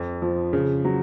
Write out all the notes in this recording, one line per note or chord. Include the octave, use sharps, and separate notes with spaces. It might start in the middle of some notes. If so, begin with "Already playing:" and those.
Already playing: F2
F3
C#3
F#3